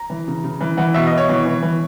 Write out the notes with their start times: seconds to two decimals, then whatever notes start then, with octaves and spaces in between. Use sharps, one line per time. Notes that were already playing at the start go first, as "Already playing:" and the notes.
Already playing: A#5
0.10 E3
0.28 C#3
0.44 C#3
0.61 E3
0.77 E3 F#5
0.94 B2 E5
1.07 D#5
1.12 B2
1.17 C#5
1.29 E3
1.46 E3
1.62 E3